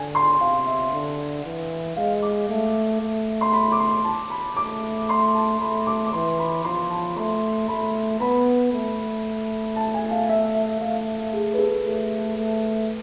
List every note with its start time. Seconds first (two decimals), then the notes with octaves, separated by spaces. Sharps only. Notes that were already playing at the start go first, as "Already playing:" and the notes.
Already playing: D3 G#5
0.15 C6
0.41 C3 F5
0.67 E5
0.93 D3
1.45 E3
1.97 G#3 F5
2.22 D6
2.49 A3
3.01 A3
3.41 C6
3.53 B5
3.72 D6
3.79 C6
4.04 A5
4.30 B5
4.56 A3 D6
5.09 C6
5.35 A5
5.60 A3 B5
5.87 D6
6.06 D6
6.13 E3 C6
6.39 B5
6.64 F3 C6
6.90 A5
7.17 A3 C6
7.68 A3 B5
8.20 B3 B5
8.72 A3
9.76 A5
9.94 G#5
10.11 F5
10.29 E5
10.55 E5
10.80 A3 F5
11.32 G#4
11.54 B4
11.59 A4
11.84 A3
12.37 A3